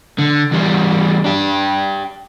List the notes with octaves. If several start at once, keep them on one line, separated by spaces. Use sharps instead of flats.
D3
E2 G3
D4 G4